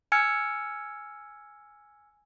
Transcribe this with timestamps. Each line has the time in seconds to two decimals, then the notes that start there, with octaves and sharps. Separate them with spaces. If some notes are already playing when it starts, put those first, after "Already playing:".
0.12 G#5 E6 F6 G#6 C#7